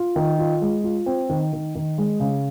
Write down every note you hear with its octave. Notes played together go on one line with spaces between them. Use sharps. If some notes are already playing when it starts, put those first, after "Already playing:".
Already playing: F4
D#3
F4
G#3
F4
C4
D#3
D#3
D#3
G#3
C#3